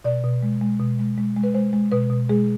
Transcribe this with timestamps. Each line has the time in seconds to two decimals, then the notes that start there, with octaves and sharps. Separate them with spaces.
0.04 B2 D5
0.24 B2
0.42 G#3
0.61 G#3
0.80 B2
0.99 G#3
1.18 G#3
1.36 G#3
1.43 B4
1.54 G#3 C5
1.73 G#3
1.92 B2 B4
2.10 B2
2.29 G#3 G#4